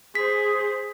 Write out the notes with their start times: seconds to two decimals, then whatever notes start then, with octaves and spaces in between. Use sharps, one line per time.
0.15 G#4 C5 B6